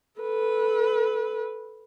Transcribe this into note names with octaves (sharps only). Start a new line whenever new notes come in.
A4 B4